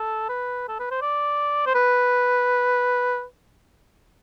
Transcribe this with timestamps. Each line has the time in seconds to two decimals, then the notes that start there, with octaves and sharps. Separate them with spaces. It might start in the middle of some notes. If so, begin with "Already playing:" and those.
Already playing: A4
0.29 B4
0.68 A4
0.79 B4
0.91 C5
1.02 D5
1.66 C5
1.75 B4